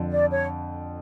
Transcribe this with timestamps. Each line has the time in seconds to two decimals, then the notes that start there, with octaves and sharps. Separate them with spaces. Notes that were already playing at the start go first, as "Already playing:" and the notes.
Already playing: F2 D3 F3
0.10 D5
0.31 C#5